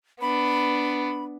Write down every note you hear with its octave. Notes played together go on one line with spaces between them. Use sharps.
B3 D4 B5